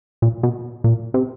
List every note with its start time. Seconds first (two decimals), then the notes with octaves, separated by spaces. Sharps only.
0.22 A#2
0.43 B2
0.84 A#2
1.14 C3